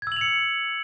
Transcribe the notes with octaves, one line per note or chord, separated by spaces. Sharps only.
E6 G#6 C#7 F7 F#7